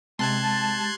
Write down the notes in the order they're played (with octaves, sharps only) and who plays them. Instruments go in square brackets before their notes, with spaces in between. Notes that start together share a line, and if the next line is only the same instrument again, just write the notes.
[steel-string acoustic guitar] C3 [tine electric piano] G#3 [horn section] A5 [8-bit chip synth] C6 F#6 G#6